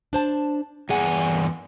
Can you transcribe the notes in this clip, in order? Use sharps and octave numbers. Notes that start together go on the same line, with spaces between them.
D4 C5 A5
E2 G2 E3 G#4 F#5 G#5